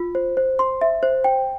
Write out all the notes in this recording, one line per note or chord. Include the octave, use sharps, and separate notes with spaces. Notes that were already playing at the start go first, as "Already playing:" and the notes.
Already playing: F4
C5
C5
C6
E5
C5
G5